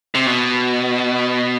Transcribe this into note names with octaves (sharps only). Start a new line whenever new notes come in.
C3
B2